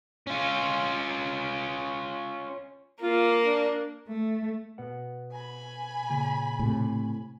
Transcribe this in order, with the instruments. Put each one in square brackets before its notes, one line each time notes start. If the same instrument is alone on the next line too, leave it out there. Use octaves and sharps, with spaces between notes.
[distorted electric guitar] C#4 F4
[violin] A#3 [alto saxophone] F4
[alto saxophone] D4
[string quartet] A3
[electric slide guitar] B2 B4 F#5
[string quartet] G#5 B5
[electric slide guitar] A#2 C#3
[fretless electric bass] A2 C3